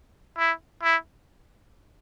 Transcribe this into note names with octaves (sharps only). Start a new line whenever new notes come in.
E4
E4